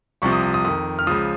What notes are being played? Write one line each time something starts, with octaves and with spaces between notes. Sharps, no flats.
C2 C3 F3 C#6
D#6
D#6
D#6
F2 D#3 D#6
F6
C#2 C#3 F3 D#6